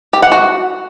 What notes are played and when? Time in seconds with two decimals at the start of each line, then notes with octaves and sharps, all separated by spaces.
0.13 G4
0.22 F#5
0.32 F#4